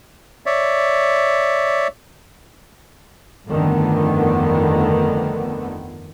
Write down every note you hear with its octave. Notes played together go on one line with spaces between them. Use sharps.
C#5 D5 E5
G1 F2 D3 D#3 A3 B3